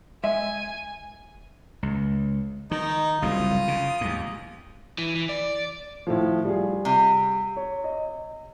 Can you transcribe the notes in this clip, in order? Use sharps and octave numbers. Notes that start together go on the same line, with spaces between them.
G#3 E5 G#5
C#2
D#3 D#4
F#1 C2 A2 F4 D#6
C#3
D#2 G#2
E3
E3
D5
A2 D#3 F3
G3 F4 G#4
C3
C#5
D#5